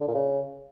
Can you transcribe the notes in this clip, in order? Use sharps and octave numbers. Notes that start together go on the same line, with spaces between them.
D3
A#2
C#3